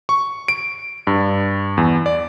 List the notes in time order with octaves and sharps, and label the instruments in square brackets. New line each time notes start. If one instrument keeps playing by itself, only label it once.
[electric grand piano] C#6
D7
G2
E2
D5